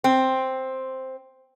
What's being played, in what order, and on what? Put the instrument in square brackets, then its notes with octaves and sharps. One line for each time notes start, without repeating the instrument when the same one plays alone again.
[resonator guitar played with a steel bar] C4